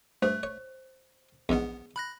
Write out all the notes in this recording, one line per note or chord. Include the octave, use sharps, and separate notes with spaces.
G2 A3 C5
C#5
A#1 E2 G#2 B3
B5 F#6 A#6